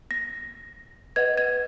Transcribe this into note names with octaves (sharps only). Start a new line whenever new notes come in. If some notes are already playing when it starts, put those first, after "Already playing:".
A#6
B4 D#5 F#5 G#6
G#6